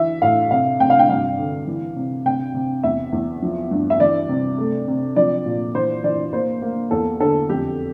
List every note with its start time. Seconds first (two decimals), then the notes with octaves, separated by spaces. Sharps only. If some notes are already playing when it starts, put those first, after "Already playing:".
Already playing: E3 E5
0.22 A2 F5
0.51 C3 F5
0.80 C3 G5
0.90 F5
0.99 G5
1.09 G2 F5
1.38 D3
1.67 E3
1.96 C3
2.26 C3 G5
2.54 C3
2.83 E2 E5
3.13 E2
3.42 F3
3.71 G2
3.90 E5
4.00 E3 D5
4.29 C3
4.58 A3
4.88 C3
5.16 F3 D5
5.46 A#2
5.75 E3 C5
6.04 E3 D5
6.33 A#3 C5
6.62 A#3
6.91 E2 A4
7.20 D3 A4
7.49 F2 G4